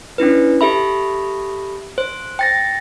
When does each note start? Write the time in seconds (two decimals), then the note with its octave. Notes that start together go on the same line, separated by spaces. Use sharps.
0.18 C#4 D4 E4 B4
0.61 G4 A4 E5 B5
1.98 C5
2.39 G5 A6 A#6